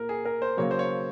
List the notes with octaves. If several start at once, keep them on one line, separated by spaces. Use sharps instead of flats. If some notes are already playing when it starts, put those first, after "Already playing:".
Already playing: A#2 A#4
G#4
A#4
C5
C#3 F#3 A#3 C#5
C5
C#5